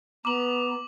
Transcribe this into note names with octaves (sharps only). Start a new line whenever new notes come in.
B3 A#5 D6 F#7